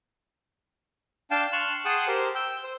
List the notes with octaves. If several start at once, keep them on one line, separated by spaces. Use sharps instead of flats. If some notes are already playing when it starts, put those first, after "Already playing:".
D4 F5 G5 A5
A5 C6 C#6 F6 F#6
G#4 F#5 G5 A5 C6 D#6
G4 A#4 C5
G5 E6 G6
C5